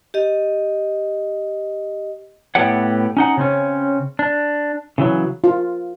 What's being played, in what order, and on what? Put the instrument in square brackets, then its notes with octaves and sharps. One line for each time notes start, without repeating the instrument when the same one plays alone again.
[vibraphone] G4 D#5
[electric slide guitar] A2 A3 B3 G4 C#5 F#5
C#4 D#4 F#5
C#3 C4 C#4
D4
C#3 E3 F#3
[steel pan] F4